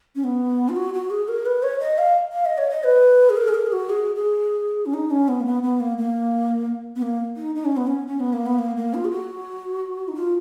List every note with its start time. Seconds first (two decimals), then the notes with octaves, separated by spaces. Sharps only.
0.16 C#4
0.24 B3
0.69 F4
0.76 F#4
0.94 F#4
1.10 G#4
1.28 A#4
1.46 B4
1.63 C#5
1.80 D#5
1.98 F5
2.32 F5
2.46 D#5
2.58 C#5
2.71 D#5
2.85 B4
3.30 G#4
3.37 A#4
3.48 G#4
3.54 A#4
3.67 G#4
3.72 F#4
3.90 G#4
4.15 G#4
4.86 C#4
4.94 D#4
5.11 C#4
5.28 B3
5.41 A#3
5.46 B3
5.63 B3
5.80 A#3
5.98 A#3
6.96 B3
7.02 A#3
7.37 D#4
7.55 D#4
7.65 C#4
7.77 B3
7.87 C#4
8.07 C#4
8.20 B3
8.33 A#3
8.46 B3
8.59 A#3
8.77 A#3
8.94 F4
9.05 G#4
9.11 F#4
10.08 D#4
10.15 F4